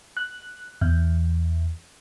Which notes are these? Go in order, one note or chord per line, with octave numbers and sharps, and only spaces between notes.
F#6
E2